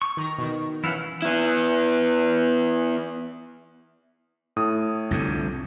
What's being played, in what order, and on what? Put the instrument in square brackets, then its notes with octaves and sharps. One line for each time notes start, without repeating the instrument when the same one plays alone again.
[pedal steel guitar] C#6
[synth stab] D#3 A#5
B2 D#3
[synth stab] E3 C#4 [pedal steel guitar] E4 F5 F#5
[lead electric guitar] B3 E4
[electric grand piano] A2 D#6
[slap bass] C2 F2 D3